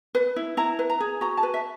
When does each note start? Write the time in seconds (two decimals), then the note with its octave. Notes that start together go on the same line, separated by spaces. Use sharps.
0.15 B4
0.36 E4
0.57 E4 A#5
0.79 B4
0.90 A#5
1.00 G#4
1.21 F#4 A#5
1.37 A5
1.43 B4
1.54 E5